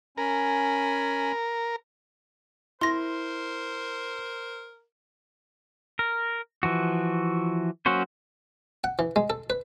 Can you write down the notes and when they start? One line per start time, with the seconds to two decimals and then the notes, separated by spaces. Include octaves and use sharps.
0.18 C#4 A#4 G#5 B5
2.81 E4 A#4 C5 C6 A#6
5.99 A#4
6.63 E3 F3 F#4
7.86 F#3 A#3 C#4 F#4 C5
8.84 F#5
8.99 E3
9.16 G#3
9.30 A4
9.50 B4